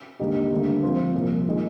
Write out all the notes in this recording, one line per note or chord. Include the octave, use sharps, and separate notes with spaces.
D#2 D3 G#3 D#4 G4
D2 D3 G3 A#3
G#2 F3 C4 F4 C5
C2 A#2 F3
D#3 G#3